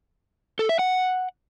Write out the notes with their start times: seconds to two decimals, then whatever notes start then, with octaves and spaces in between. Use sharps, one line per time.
0.59 A4
0.69 E5
0.79 F#5